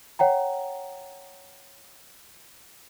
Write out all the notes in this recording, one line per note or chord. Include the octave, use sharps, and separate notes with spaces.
C#5 F#5 G5 A#5